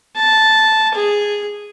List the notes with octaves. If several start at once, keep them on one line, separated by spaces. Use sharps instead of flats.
A5
G#4